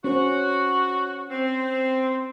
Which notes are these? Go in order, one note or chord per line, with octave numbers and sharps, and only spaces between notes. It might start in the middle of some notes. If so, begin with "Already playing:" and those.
C#4 F#4 C5
C4